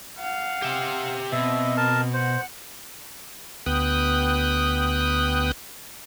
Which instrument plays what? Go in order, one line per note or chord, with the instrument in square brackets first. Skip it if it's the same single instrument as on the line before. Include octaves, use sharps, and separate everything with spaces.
[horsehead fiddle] F5 F#5
[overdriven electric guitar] G4 E5
[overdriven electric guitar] B2 [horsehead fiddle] C4 D#5 [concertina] E5
[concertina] A#4 A5
[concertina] C5 [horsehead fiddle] F#5
[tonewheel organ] D2 B3 G5 D#6 F#6